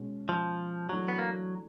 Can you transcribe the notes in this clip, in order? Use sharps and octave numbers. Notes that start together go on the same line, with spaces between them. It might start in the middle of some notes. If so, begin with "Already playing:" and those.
Already playing: B2 G#3 C#4
F3
E3 F#3 A3 D4 F#4
B3
A#3